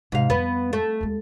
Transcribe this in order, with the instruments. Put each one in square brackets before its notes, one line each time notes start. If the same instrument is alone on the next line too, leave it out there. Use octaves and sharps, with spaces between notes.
[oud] G#2 F5 [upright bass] C3
[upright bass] F2 G3 [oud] B3
[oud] A3
[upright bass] D#2 G#3